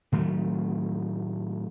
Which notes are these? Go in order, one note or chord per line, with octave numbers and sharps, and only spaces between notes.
A2 D#3 F#3 A3